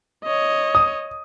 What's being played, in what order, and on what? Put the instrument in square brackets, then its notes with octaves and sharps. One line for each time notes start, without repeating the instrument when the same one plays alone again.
[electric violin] C#5 D#5
[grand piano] D#6